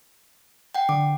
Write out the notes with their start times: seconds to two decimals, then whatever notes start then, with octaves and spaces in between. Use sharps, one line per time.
0.75 F#5 G5
0.89 D3 D6